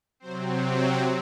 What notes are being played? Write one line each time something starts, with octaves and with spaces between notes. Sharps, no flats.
C3 F#3 C4 C5